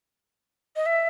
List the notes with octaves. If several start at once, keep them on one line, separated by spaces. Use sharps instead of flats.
D#5
E5